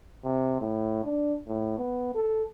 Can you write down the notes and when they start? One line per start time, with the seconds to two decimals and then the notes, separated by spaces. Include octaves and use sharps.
0.25 C3
0.61 A2
1.05 D4
1.48 A2
1.78 B3
2.15 A4